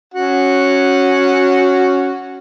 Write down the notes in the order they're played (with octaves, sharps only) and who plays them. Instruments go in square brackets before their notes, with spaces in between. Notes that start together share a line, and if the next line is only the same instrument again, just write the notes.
[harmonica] C#4 F#4 F#5